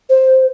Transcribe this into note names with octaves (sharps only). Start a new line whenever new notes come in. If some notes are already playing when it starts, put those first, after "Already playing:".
C5